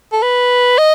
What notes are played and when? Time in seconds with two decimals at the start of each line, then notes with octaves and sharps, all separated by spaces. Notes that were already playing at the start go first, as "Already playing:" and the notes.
0.12 A4
0.22 B4
0.78 D#5